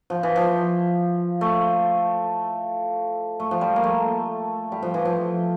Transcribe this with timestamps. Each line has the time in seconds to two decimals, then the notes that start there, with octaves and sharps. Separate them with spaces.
0.10 F3
0.23 E3
0.36 F3
1.41 A3
3.40 A3
3.51 F3
3.61 G3
3.76 A#3
3.83 A3
4.72 G3
4.82 F3
4.94 E3
5.05 F3